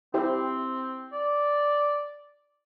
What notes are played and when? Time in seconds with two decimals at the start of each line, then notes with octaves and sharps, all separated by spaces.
0.14 C4 E4 G4 C5
1.12 D5